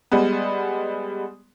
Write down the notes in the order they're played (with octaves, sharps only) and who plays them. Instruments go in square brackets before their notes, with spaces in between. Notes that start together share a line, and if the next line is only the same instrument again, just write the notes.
[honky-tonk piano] G3 G#3 B3